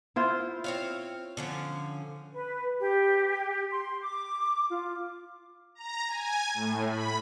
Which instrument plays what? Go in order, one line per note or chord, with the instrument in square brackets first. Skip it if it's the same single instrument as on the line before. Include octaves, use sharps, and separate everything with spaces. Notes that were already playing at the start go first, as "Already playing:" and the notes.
[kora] E4 F4 C5
[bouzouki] C4 C#5 F5
D3 F3 C#4
[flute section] B4
G4
C6
D6
F4
[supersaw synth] A#5
G#5
A2
B5